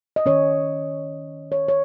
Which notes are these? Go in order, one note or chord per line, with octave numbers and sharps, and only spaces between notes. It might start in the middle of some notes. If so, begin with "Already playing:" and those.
D#5
D#3 C#4 C#5
C#5
C#5